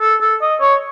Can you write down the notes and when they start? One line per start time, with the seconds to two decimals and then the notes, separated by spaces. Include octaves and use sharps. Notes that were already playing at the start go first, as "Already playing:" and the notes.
0.01 A4
0.21 A4
0.41 D#5
0.61 C#5